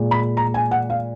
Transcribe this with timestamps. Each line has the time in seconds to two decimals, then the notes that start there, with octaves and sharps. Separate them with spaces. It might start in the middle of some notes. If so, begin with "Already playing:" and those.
Already playing: A#2 G#3
0.11 B5
0.37 A#5
0.54 G#5
0.71 F#5
0.90 F5